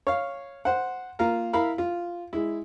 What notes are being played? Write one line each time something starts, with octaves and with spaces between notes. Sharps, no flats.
C#5 F5
C5 F#5
A#3 F4 F5 A#5
E4 A#4 F5 B5
F4
G#3 E4